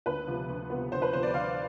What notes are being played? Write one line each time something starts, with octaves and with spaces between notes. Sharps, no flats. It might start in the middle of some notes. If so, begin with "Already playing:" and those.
D2 B4
C3 F3 B3
D2
C3 F3 B3
D2 C5
B4
C3 F3 B3 C5
D5
D2 F5